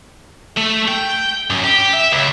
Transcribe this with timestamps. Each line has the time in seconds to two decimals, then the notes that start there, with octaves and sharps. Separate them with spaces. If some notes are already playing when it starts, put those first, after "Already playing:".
0.57 A3
0.88 G5
1.50 F#2
1.64 G4
1.93 E5
2.12 C#2